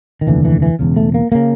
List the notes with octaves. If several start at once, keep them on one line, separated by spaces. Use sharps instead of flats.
D#3
F1 D#2 D3 E3
E3
E3
E1 E2 C#3
A3
A#3
C#3 A#3